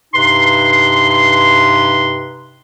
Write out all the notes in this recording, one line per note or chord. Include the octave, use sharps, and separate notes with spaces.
G2 C3 D#4 B4 C6